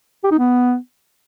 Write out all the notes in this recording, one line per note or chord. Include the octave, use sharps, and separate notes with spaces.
G4
D#4
B3